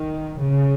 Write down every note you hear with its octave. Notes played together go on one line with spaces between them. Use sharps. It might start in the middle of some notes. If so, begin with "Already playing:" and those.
Already playing: D#3
C#3